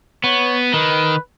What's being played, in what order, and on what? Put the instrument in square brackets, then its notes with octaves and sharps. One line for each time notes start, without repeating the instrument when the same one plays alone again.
[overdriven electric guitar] B3 [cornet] C#5
[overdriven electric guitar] D#3 [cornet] B4